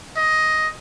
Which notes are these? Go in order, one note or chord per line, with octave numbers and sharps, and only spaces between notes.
D#5